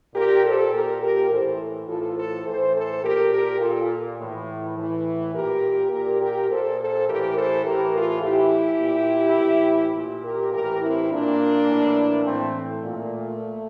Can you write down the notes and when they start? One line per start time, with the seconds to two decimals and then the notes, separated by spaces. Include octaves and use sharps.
0.15 A#2 G4 A#4
0.44 A4 C5
0.73 A#2 G4 A#4
1.02 G4 A#4
1.31 A2 E3 A4 C5
1.88 A2 E3 F4 A4
2.17 A4 C5
2.45 A2 E3 A4 C5
2.74 A4 C5
3.03 A#2 G4 A#4
3.32 G4 A#4
3.61 A#2 F4 A4
4.19 A2 E3
4.77 A2 E3
5.34 A#2 G4 A#4
5.92 A#2 G4 A#4
6.20 G4 A#4
6.49 A#2 A4 C5
6.78 A4 C5
7.07 A2 E3 G4 A#4
7.36 A4 C5
7.64 A2 E3 G4 A#4
7.94 F4 A4
8.22 A2 E3 E4 G4
8.80 A#2
9.38 A2 E3
9.95 A#2
10.24 G4 A#4
10.53 A2 E3 G4 A#4
10.81 C4 E4
11.10 A#2 A#3 D4
11.68 A2 E3
12.26 A2 E3 A3 C4
12.55 A3
12.83 A#2